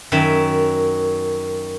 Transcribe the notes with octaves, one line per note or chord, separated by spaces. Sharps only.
F#2 D#3 E5